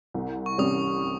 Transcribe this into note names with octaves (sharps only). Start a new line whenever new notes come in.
C2
C#6
C3 G3 C#4 G4 D#6